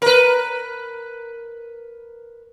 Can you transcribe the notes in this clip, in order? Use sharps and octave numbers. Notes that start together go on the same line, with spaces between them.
A#4 B4